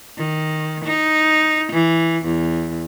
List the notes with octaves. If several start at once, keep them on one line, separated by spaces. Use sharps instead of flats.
D#3
D#4
E3
E2